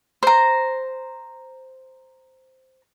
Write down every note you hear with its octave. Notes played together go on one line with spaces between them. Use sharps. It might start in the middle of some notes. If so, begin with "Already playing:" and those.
C5 A#5